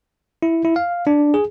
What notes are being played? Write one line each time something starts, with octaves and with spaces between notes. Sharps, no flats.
E4
E4
F5
D4
G#4